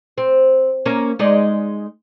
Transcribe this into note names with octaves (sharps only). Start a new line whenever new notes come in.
C4
A#3 C#4
G#3 D#4 D5